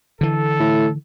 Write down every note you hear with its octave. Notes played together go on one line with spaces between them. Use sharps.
D3 E3 A4
A2